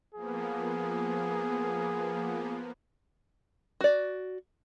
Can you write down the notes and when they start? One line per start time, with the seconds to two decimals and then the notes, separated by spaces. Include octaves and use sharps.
0.14 F3 A#3 B3 G#4
3.81 F#4 D5